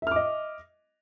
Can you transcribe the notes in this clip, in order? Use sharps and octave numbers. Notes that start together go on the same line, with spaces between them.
D#5 E5 D6 F6